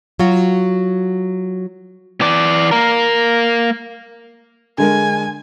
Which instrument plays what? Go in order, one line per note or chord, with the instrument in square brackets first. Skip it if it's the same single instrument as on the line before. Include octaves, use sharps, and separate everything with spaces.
[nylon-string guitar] F#3 F4 F#4
[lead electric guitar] E3 D5
A#3 A#4
[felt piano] D3 G#3 A#4 [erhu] G#5